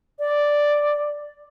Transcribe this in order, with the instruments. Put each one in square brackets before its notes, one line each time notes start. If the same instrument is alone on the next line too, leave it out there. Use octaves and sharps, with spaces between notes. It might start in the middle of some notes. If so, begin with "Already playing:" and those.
[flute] D5